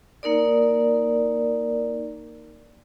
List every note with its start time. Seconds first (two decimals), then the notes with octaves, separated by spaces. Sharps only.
0.23 A#3 D#4 A#4 D5